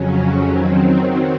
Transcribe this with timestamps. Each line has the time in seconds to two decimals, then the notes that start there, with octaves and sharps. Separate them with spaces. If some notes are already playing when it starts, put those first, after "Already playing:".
Already playing: F2 C#3 F#3 C#4
0.48 D#3 F#3 C4